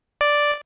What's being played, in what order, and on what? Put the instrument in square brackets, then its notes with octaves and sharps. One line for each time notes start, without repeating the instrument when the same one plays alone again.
[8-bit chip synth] D5